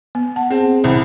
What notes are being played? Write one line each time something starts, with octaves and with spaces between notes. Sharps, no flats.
B3
F#5 A5
C4 G#4
C2 C5 B5